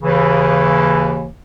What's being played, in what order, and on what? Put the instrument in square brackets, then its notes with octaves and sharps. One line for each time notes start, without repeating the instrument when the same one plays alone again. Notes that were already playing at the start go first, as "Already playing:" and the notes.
[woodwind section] D#2 C#3 E3